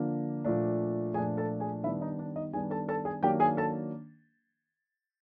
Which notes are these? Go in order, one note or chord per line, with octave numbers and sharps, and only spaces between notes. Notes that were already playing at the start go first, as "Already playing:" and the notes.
Already playing: D3 F3 A#3 D4
A#2 F3 A3 D4
A#2 F3 A3 D4 G#4 G#5
A4 A5
G#4 G#5
D#3 G3 B3 D4 E4 E5
D#4 D#5
D4 D5
D#4 D#5
D#3 G3 B3 D4 G#4 G#5
A4 A5
A4 A5
G#4 G#5
D#3 F#3 A#3 D4 G4 G5
G#4 G#5
A4 A5